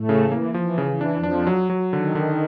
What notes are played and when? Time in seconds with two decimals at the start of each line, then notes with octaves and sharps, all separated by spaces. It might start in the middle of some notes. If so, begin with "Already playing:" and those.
Already playing: A2 A3
0.09 C#3
0.24 E3
0.32 A#3
0.54 E3 F3
0.78 C#3
0.85 E3
1.01 D4
1.15 F2 F3
1.23 D4
1.47 F#3
1.70 F#3
1.92 D3 D#3
2.15 D3